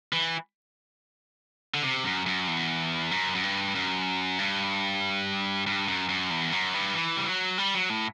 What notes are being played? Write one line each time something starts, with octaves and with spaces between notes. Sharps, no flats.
E3
D3
C3
F#2
F#2
E2
F#2
F#2
G2
F#2
G2
G2
F#2
F#2
E2
F#2
G2
E3
G3
F#3
G3
F#3
A2